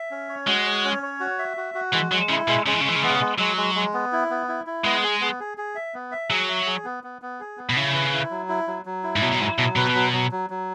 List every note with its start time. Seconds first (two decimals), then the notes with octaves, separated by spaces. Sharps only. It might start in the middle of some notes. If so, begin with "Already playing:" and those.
Already playing: E5
0.11 C#4
0.29 C#5
0.47 G#3 F#4
0.66 C#5
0.85 C#4
1.03 C#5
1.20 F#4
1.39 E5
1.57 F#4
1.75 F#4
1.93 E3 G#3
2.12 F#3 G#3
2.29 C#3 E4
2.48 B2 G#3
2.66 C#3 G#3
2.74 E3
2.80 C#3
2.85 E3 G#3
2.95 C#3
3.03 E3 B3
3.10 C#3
3.21 G#3
3.39 F#3 G#3
3.57 G#3
3.75 G#3
3.94 B3
4.12 E4
4.30 B3
4.48 E4
4.66 E4
4.84 G#3 B3
5.03 G#4
5.21 B3
5.40 G#4
5.58 G#4
5.75 E5
5.94 B3
6.12 E5
6.30 F#3 G#4
6.49 E5
6.67 G#4
6.84 B3
7.04 B3
7.22 B3
7.40 G#4
7.57 B3
7.70 B2
7.76 C#3 E4
7.94 B4
8.13 E4
8.30 F#3
8.49 E4
8.68 F#3
8.86 F#3
9.04 E4
9.16 G#2
9.21 B2 F#3
9.32 B2
9.40 G#2 E4
9.58 B2 F#3
9.76 B2 B4
9.95 F#3
10.13 F#3
10.31 F#3
10.50 F#3